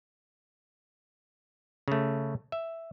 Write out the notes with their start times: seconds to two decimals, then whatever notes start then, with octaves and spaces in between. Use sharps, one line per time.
1.88 C#3 A3
2.52 E5